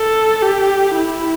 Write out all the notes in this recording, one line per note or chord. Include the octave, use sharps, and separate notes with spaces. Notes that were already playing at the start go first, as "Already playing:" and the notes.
Already playing: A4
G4
E4